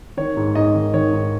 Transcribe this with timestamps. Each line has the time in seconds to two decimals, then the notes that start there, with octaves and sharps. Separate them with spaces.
0.17 D#3 C#5
0.37 G#2
0.55 G#2 D#5
0.74 D#3
0.94 D#3 C#5
1.13 G#2